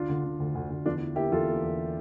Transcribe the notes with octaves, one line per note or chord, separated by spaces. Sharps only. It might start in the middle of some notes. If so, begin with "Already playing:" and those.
Already playing: D2 D4 F4
D3
D3
D2
D2
D2
E2 D4 F4
E3
A#3 E4 G4
E2 F4 A4
A#3
E1